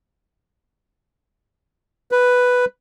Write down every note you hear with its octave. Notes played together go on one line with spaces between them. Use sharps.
B4